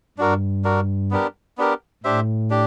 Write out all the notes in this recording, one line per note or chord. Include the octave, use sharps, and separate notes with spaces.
G2 D4 F#4 A#4
D4 F#4 A#4
B3 D4 G4 A#4
B3 D4 G4 A#4
A2 D4 G4 C5 E5
D4 G4